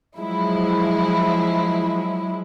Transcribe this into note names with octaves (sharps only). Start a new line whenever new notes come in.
F3 F#3 G#3 E4